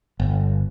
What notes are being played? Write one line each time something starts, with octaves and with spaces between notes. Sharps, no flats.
G1